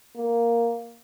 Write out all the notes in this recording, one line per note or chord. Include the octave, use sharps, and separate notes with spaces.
A#3